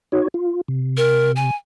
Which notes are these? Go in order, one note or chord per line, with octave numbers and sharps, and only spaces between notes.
D#4 F#4 C#5
F4
C3
A#4
G#5